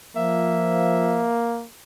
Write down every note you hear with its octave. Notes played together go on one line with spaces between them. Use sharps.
F3 A#3 E5